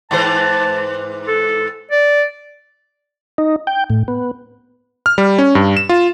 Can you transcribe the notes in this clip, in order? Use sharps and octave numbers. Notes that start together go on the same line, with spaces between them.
G#2 E3 C5 A5
A4
D5
D#4
G5
A2
B3
F6
G3
C#4
G2
E7
F4